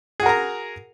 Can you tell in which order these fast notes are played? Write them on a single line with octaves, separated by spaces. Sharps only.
G#4 F#4 A#4 A#5